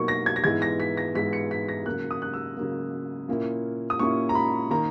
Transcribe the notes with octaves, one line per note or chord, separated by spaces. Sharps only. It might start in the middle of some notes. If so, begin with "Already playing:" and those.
Already playing: B2 F#3 A#3 D#4 C#6
A#6
G#6
A#6
G#2 E3 G#3 B3 E4 G#6
A#6
B6
A#6
G#2 E3 G#3 B3 E4 B6
C#7
B6
A#6
C#3 F#3 A#3 F#6
D#6
F#6
E6
C#3 F#3 A#3
A#2 A#3 C#4 E4
D#6
A#2 A#3 C#4 E4 C#6
A#5
B5
D#3 A#3 A#5